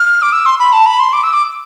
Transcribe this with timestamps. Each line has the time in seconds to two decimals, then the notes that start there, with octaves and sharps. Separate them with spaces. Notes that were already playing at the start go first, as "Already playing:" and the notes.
Already playing: F6
0.22 D6
0.33 E6
0.46 C6
0.59 B5
0.73 A5
0.86 B5
1.00 C6
1.13 D6
1.23 E6
1.33 D6